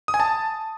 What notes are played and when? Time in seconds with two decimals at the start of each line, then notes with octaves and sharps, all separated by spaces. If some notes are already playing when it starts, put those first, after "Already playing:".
0.08 D#6
0.14 G#5
0.20 A5